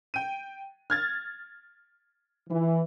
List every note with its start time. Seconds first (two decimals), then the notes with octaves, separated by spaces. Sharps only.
0.14 G5 D#7
0.90 F6 G#6 A6
2.50 E3